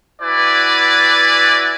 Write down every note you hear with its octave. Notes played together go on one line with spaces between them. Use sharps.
E4 F#4 B4 D5 G#5